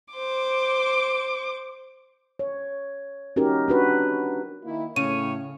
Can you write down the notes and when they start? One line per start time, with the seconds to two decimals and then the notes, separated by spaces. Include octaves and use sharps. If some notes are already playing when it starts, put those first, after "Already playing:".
0.14 C5 D6
2.39 C#5
3.36 C#4 D#4 F#4 G4 A#4
3.68 D4 F#4 B4
4.63 D#3 A#3 E4
4.96 A2 C#3 C#5 D#7